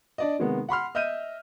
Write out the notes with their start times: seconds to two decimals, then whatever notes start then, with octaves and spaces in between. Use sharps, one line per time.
0.18 D4 D5 D#5
0.39 C3 D#3 G#3 A#3 B3
0.69 F#5 B5 C6 F6
0.95 D#5 E5 F6 G6 D#7